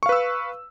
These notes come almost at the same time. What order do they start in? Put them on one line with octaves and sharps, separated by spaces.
C#6 F5 B4 E6